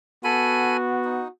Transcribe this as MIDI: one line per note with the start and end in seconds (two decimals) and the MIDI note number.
0.24 1.25 59
0.24 1.29 66
0.24 0.77 69
0.24 0.77 80
0.24 0.77 83
1.05 1.28 63